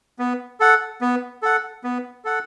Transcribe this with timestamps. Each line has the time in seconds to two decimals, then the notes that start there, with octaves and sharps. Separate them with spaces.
0.19 B3
0.60 A4 F#5
1.01 B3
1.43 A4 F#5
1.84 B3
2.25 A4 F#5